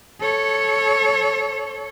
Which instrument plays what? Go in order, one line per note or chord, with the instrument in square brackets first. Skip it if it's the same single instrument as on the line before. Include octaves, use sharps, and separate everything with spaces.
[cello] A4 C#5